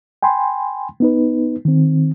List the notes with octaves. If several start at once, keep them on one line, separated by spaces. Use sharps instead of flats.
G5 G#5 B5 C6
B3 D#4 B4
D#3 C4